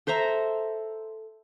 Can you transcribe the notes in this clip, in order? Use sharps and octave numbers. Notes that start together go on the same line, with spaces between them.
A4 C5 E5 A#5